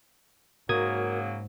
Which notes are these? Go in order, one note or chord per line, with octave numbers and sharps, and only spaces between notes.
G#2 C#3 F#3 A#3 F#4 A#4 D#6 G#6